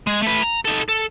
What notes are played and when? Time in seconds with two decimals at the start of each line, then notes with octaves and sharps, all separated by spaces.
0.07 G#3
0.22 A3 B4
0.42 A#5
0.65 D#4 A4
0.89 A4